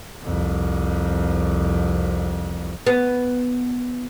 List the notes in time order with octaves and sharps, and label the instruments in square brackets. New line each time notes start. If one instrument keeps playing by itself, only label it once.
[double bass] C2 F2
[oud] B3